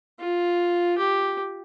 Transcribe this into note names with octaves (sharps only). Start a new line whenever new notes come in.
F4
G4